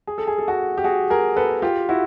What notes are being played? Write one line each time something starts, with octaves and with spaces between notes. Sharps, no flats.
G#4
A4
G#4
A4
F#4 G#4
G4
F#4 G#4
G#4 A#4
A4 B4
F4 G4
E4 F#4